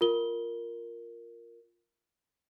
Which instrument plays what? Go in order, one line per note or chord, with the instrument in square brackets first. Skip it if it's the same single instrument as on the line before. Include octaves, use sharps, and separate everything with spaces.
[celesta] F4 A#4 G7